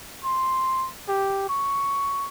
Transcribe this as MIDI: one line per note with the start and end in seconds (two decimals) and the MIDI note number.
0.24 0.88 84
1.08 1.44 67
1.49 2.28 85